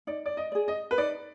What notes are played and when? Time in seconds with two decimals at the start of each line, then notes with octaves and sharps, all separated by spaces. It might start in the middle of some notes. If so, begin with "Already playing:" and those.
0.07 D#4 D5
0.26 D5
0.37 D#5
0.52 G#4 D5
0.68 D#5
0.91 B4
0.98 D#4 D5